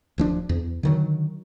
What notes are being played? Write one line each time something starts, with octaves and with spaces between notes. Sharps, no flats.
D1 F3 D4
E2
D3 D#3 F#3